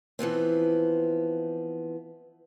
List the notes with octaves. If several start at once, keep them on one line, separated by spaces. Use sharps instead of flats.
E3 F3 B3 C4